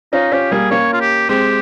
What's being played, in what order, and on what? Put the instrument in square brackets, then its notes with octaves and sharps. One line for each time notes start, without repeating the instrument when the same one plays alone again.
[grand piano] C#4 F4 [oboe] D#4
[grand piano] C#4 F4 [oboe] G4
[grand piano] G3 A#3 [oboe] G#4
[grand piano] A#3 C#4 [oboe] C#5
[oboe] F4
G4
[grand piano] G#3 C4 [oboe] G4